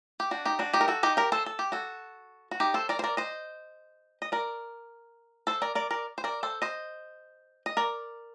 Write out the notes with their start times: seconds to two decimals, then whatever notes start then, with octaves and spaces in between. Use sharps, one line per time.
0.20 G4
0.31 D4 F#4
0.45 D#4 G4
0.59 D4 F#4
0.74 D#4 G4
0.81 A#4
0.88 F#4 A4
1.03 D#4 G4
1.17 G4 A#4
1.32 A4 C5
1.46 A4
1.59 G4
1.72 F#4 A4
2.51 F#4
2.60 D#4 G4
2.74 A4 C5
2.89 A#4 D5
2.99 C5
3.04 A#4 D5
3.17 C5 D#5
4.22 D#5
4.32 A#4 D5
5.47 A4 C5
5.62 A#4 D5
5.75 A#4 D5
5.91 A#4 D5
6.18 C5
6.24 A#4 D5
6.43 A4 C5
6.62 C5 D#5
7.66 D#5
7.77 A#4 D5